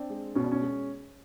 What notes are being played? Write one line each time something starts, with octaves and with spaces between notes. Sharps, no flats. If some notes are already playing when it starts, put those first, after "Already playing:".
Already playing: C4 D4
G#3
B2 C#4
D4
C#4
G#3